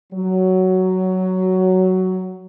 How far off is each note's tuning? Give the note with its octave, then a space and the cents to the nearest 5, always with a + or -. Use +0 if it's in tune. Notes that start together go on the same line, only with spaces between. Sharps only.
F#3 +10